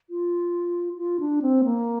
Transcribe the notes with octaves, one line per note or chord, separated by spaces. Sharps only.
F4
F4
D4
C4
A#3